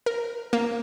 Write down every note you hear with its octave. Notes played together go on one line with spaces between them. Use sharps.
A#4
A#3